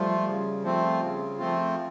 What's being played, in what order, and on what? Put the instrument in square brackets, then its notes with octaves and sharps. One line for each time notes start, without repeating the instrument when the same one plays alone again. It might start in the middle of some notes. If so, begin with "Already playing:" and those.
Already playing: [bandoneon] F3 A3 F4 [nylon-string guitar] G3
[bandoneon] C#3
F3 A3 C4 F4
C#3
F3 A3 C4 F4